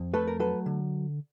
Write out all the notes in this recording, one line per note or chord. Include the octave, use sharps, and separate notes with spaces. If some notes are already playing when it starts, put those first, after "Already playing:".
Already playing: F2
A3 A4 B4
A#4
F#3 A4 B4
D3